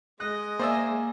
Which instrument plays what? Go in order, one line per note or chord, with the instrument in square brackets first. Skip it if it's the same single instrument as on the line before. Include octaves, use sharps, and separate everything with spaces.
[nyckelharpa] G#3 [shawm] D#5 [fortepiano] F#6
[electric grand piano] A#3 G#5 [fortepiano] C5 D5 E5